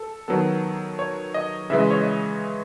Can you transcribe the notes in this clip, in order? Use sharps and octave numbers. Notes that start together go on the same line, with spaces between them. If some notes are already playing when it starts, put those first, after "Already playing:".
Already playing: A4
D#3 F#3 B3 A4
C#5
D#5
C#3 E3 G#3 E5
D#5
C#5
D#5